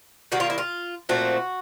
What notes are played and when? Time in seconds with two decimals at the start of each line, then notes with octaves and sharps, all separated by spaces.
0.32 D#3 G3 A#3 F#4
0.40 F4
0.50 E4
0.58 F4
1.09 A#2 F3 A3 C4 F#4